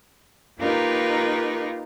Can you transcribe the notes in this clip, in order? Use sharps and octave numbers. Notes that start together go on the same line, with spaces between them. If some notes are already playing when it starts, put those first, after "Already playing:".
A#3 D#4 F4 G4 A#4 B4